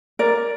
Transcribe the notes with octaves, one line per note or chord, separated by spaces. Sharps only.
A#4 D5